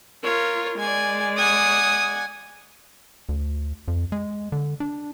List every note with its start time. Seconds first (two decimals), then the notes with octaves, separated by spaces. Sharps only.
0.23 F4 A#4 C#5
0.78 G#3 D5 G#5
1.38 F#5 G#5 D#6
3.29 D2
3.88 F2
4.12 G#3
4.52 D3
4.80 D4